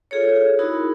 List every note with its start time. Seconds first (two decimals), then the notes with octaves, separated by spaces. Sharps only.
0.11 F4 G#4 A4 C#5
0.59 D#4 E4 F#4 G#4 A#4 B5